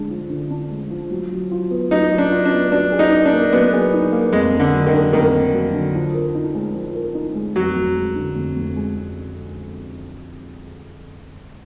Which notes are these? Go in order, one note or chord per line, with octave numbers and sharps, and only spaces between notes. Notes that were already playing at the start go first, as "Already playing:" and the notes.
Already playing: D3 G#3 D4
F3
D3
D4
G#3
F3
F#3
F#3
F4
B3
F#3 D#4
F#3
D4
F4
D4
B3
F#3 D4
G#4
D#4
D#4
D4
A#3
F#3 B3
G#4
D#4
A#3
F2 G#3
A#3
D3
F#3
D#3
D3
F2 D#3
A#3
F#3
D3
F3
A#4
D#4
G#3
F3
A#4
D#4
G#3
F2 F#3
F2
G#3
D3
F2
F2
G#3